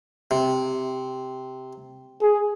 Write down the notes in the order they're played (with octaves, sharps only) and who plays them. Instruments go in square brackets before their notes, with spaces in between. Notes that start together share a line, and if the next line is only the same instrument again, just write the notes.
[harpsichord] C3
[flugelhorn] G#4